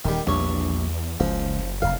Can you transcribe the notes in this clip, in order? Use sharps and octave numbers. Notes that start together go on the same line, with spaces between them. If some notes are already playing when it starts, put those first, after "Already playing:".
D#1 D#3 G3
A#1 E2 G2 C#5
F#1 C#2 F3
F1 E2 C#3 F5